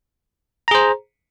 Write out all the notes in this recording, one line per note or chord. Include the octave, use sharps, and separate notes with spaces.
G#4 C5 A#5